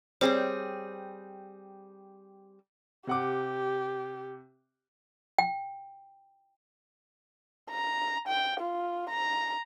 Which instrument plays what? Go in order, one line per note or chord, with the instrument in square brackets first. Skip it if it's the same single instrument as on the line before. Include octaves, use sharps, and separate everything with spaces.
[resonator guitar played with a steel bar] G3 C4 G#4 [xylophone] C5 C#5
[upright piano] C3 F#5 D6 [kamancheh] G4
[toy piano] G5
[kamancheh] A#5
G5
F4
A#5